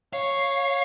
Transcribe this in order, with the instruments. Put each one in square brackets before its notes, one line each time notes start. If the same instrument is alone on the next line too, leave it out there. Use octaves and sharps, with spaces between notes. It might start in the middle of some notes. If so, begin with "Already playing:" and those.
[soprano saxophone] C#5 [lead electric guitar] F5